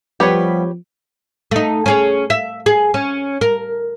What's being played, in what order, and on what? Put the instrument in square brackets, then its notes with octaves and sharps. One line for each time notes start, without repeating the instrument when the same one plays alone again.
[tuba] F3 [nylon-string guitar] G3 B3 [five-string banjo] G4 B4 C#5
[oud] A3 D#4
C#4 G#4 C#5
E5
G#4
C#4
A#4